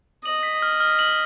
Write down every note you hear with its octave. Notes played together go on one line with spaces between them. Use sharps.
D#5 F#7
B6
F6
F6
F#7